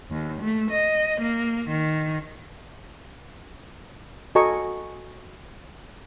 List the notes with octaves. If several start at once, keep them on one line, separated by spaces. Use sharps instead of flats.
D#2
A3
D#5
A#3
D#3
F#4 A4 D#5 G#5 A#5 C#6